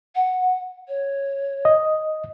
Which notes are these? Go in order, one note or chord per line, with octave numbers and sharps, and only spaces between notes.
F#5
C#5
D#5